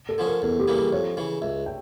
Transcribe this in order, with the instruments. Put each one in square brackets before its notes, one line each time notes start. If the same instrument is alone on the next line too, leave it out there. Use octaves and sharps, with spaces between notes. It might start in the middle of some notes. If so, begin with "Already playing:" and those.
[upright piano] A4
[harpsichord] D3 F3 C#4
[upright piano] A#4
[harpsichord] E2 [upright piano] A4
[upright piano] G4
[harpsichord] C#3 E3 G3 A#3
[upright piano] A4
[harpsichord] F2 [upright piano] C#5
[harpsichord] C#3 E3
[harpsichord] C#2 [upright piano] E5
[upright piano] G5